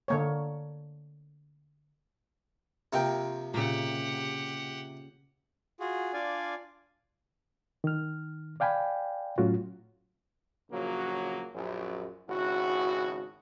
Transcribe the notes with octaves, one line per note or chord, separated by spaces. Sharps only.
D3 A#3 C#5
C3 F3 A#3 C4 A#4 G5
A#2 C#3 G4 F#5
F4 F#4 G#4
D4 F4 D5 F5 G#5
D#3 F6
D5 F5 G5 G#5 B5
A2 F#3 C#4 F4 F#4
A#1 C#3 F3 F#3 A#3 F#4
A#1 F#2 F#3
G#1 C#3 E4 F#4